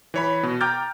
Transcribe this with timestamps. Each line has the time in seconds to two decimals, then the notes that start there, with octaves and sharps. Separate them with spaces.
0.14 E3 C#5 B5
0.43 B2
0.61 G5 A#5 D6 F6 G6 A6